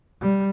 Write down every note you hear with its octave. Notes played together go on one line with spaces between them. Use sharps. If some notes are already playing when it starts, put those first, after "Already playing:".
G3